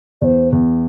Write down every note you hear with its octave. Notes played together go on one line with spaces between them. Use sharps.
E2 C5 D5
E2